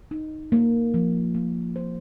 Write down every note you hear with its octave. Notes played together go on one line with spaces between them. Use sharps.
D#4
A#3
F3
A#3
C5